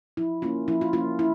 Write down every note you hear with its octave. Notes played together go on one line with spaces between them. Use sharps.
F3 E4
A#3 C#4 F4
F3 E4
F4
A#3 C#4 F4
E4